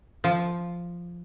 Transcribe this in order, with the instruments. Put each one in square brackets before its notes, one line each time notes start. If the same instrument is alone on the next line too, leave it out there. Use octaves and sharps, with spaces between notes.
[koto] F3